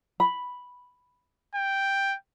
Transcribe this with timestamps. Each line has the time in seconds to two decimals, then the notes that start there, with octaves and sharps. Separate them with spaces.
0.20 B5
1.55 G5